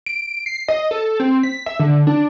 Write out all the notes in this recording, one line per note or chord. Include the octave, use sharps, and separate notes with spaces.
D7
C7
D#5
A4
C4
B6
E5
D3
D4